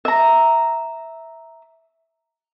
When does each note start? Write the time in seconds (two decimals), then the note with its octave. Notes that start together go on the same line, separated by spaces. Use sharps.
0.05 E5 A#5